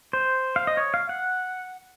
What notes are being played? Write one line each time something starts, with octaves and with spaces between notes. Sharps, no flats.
C5
F5
D#5
C#5
F5
F#5